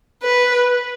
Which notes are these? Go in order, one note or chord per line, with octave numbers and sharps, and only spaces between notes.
B4